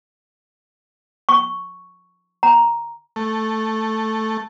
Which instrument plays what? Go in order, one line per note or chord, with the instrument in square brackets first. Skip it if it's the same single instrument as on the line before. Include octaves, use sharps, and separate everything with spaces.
[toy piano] C#6
A#5
[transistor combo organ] A3